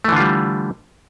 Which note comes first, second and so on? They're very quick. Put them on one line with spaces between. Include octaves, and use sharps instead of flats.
A3 E3 D3 F4 G3